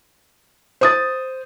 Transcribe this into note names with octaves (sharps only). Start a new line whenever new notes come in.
C5 D#6 A6